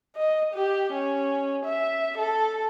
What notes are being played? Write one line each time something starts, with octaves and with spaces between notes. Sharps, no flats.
D#5
G4
C#4
E5
A4